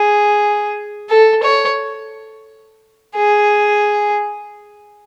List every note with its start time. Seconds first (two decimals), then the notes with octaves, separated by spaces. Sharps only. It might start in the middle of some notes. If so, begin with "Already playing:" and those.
Already playing: G#4
1.09 A4
1.43 C#5
3.16 G#4